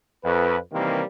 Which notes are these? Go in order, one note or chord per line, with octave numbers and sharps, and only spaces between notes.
F2 B4
C3 D#3 E3 G3 A#3 C4